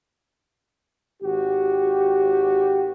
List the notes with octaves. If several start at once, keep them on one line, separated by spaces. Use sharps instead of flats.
G#1 F#4 G4